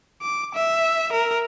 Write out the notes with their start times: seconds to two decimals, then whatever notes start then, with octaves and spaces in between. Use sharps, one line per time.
0.22 D6
0.55 E5
1.13 A#4